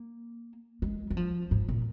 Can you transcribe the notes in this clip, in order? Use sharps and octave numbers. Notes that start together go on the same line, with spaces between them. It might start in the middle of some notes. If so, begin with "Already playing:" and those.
Already playing: A#3
G#3
F#3
F3
G#2
A#2